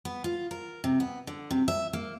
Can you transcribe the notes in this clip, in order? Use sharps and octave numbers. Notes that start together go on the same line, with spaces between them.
B3
F4
A#4
C3
B3
D3
C3
E5
A#3